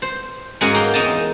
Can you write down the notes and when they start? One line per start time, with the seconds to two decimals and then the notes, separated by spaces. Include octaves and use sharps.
0.02 C5
0.61 G#2 G#3 A#3 C#4 F#4 G#4
0.75 A#3 G5
0.94 E2 G#3 D#4 D#5 A5